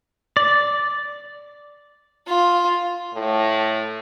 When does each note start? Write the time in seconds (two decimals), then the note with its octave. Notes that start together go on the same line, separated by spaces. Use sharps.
0.37 D5
2.27 F4
3.14 A2